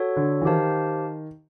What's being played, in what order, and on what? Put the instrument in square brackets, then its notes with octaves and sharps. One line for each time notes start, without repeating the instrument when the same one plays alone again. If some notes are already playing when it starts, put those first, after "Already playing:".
Already playing: [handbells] F#4 A4 C#5
[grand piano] D3
E3
[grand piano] D#3 [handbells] G4 C5 F5 A5